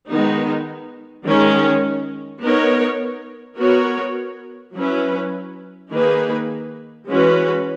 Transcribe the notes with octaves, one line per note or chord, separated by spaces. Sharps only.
D#3 G#3 B3 D#4
D#3 G#3 C#4
B3 D#4 A#4 C#5
B3 F#4 A#4 C#5
F#3 C#4 E4 B4
D#3 A#3 D#4 G#4 B4
E3 G#3 C#4 F#4 B4